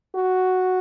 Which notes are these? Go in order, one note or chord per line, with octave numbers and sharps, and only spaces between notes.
F#4